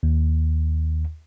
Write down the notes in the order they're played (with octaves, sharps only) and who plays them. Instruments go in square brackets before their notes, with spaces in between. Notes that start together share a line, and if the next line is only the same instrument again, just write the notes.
[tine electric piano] D#2